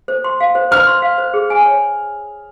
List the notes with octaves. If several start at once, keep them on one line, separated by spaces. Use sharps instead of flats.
C5
C6
F5
C5
C5 F6
C6
F5
C5
G#4
G#5
C#5